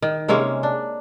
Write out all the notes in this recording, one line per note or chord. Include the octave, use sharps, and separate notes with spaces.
D#3
C3 G#3 A#3 C#4
D4